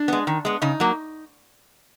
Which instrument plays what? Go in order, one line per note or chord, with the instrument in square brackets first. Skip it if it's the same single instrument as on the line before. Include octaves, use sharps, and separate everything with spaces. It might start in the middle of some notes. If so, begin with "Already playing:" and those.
Already playing: [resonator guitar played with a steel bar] D4
G#3 B3
D#3
G#3 B3
C#3 D#4
F#3 A#3